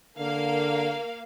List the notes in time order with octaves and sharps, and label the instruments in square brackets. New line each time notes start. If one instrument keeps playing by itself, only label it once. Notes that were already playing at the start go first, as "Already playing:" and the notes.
[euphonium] D3 [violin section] A#3 F5